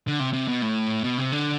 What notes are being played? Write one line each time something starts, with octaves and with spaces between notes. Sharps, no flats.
D3
C3
C3
B2
A2
B2
C3
D3